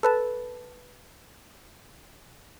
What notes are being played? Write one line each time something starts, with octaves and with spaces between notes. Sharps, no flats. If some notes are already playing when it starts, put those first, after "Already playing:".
A4 B4 A5